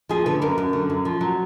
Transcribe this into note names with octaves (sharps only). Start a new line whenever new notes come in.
F3 G#4
D3 B4
F#2 A#4
F#2
D3
F#2
F3
F#3